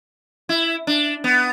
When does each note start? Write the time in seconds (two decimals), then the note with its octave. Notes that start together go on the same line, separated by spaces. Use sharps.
0.49 E4
0.87 D4
1.24 B3